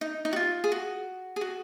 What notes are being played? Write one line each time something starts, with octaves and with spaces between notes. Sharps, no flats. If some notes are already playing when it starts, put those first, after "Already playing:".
D#4
D#4
F#4
F4
G#4
F#4
G#4
F#4